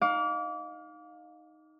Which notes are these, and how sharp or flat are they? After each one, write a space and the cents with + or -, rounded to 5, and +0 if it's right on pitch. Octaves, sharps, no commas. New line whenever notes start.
D#4 +0 F5 +25 D6 -30